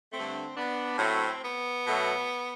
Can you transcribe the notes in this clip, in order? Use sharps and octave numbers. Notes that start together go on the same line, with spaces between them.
G2 D3 A3 C4
B3 D4
A2 F#3 A3 C4
B3
B2 F#3 A3